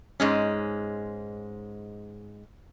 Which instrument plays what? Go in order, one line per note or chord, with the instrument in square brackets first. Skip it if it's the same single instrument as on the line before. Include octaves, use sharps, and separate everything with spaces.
[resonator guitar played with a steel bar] G#2 G#3 C#4